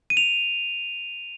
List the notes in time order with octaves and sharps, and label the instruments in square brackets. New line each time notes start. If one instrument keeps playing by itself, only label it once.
[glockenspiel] D#7
F7